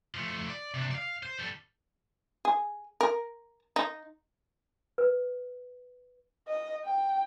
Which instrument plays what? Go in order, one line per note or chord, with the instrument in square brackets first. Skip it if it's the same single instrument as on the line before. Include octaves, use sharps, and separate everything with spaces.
[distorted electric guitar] F3 A3
D5
C3 D4
D5 F5
C5
G3 A4
[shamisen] G#4
A#4
D#4
[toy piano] B4
[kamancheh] D#5
G5